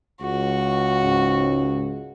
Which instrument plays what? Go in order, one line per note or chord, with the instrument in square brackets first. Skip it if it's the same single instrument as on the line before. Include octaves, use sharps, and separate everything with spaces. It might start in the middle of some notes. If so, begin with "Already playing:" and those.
[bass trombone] C#2 [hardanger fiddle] F#4
[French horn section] G#2 C#4